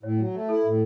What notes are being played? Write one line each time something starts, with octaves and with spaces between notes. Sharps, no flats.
A2 C#5
F#3
A3
E4 A4
A2